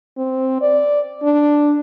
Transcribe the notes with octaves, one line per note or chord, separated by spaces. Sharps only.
C4
D5
D4